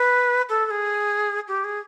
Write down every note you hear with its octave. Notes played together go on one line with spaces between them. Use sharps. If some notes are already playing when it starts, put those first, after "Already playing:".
Already playing: B4
A4
A4
G#4
G4
G#4